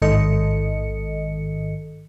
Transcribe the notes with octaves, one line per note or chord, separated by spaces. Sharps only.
A1 G#2 D#3 A4 D#5 C#7